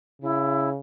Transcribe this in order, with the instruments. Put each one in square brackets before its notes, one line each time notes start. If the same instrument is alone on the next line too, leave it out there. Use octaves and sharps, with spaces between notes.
[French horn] C#3 [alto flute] E4